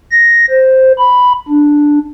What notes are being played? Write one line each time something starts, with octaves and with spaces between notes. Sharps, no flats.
A#6
C5
B5
D4